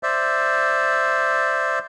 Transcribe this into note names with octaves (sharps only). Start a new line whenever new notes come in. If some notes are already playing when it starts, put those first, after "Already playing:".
C5 D5 E5